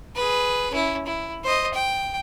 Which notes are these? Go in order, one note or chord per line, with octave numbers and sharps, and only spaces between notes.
G#4 B4
C#4 E4
E4
C5 D#5
G5